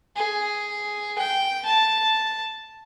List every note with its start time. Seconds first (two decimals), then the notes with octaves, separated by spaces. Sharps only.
0.16 G#4
1.19 G5
1.66 A5